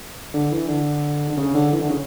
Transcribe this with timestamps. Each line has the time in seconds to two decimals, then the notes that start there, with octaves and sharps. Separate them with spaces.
0.34 D3
0.51 E3
0.68 D3
1.30 D3
1.37 C#3
1.55 D3
1.73 E3
1.81 D3
1.90 C#3